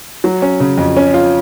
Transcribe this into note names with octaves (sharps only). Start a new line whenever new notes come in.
F#3
C#4
C#3
F2
C#4
F4